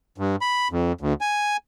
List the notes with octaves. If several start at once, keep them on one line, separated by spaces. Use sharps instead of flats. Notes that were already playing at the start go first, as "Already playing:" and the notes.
G2
B5
F2
D2
G#5